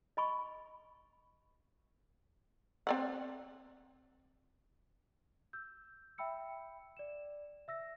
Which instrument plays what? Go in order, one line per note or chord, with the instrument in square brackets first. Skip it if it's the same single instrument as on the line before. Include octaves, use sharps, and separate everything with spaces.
[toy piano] D#5 B5 C#6
[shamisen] C4 D5 F#5
[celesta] E6 G6
E5 G5 B5 E6 C#7
D5 E7
E5 E6 A#6